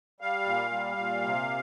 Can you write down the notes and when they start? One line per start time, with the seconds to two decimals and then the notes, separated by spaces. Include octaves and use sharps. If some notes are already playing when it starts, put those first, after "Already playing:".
0.21 G3 F5
0.45 A#2
0.71 G3
0.97 A#2
1.23 C3